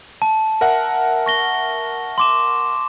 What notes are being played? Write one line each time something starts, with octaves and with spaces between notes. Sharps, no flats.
A5
A#4 E5 F#5
C#6 A#6 G7
C6 D6 E7